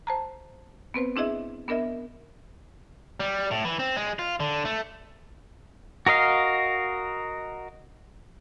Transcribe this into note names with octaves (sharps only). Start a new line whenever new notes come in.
C5 A5 A#5
B3 C4 B4 C5
C4 D4 E4 G#4 D#5 E5
B3 D4 A#4 D#5 E5
G3
A2
E3
C4
G#3
F4
D3
A3
F#4 A#4 D#5 F5